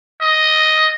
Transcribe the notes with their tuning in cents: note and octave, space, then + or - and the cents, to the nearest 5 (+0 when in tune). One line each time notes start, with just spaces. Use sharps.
D#5 +5